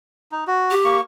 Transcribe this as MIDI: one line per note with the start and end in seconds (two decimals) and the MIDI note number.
0.32 0.44 63
0.47 0.75 66
0.71 0.97 67
0.85 1.01 58
0.85 1.01 85